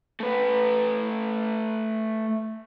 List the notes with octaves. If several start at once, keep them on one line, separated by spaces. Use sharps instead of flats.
A3 B4